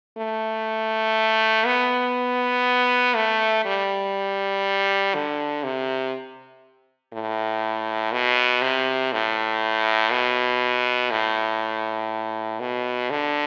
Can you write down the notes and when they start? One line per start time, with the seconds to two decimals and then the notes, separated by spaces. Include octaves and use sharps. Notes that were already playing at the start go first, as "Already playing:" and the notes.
0.18 A3
1.66 B3
3.16 A3
3.65 G3
5.14 D3
5.64 C3
7.13 A2
8.12 B2
8.62 C3
9.12 A2
10.11 B2
11.10 A2
12.60 B2
13.10 D3